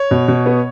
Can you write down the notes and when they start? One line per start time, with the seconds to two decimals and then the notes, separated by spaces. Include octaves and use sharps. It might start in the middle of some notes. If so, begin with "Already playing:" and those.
Already playing: C#5
0.11 B2
0.28 B2
0.46 B3